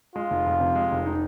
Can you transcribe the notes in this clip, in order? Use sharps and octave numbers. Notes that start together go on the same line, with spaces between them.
G#3 F4
F1
F2
C3
G#3
F1
D#4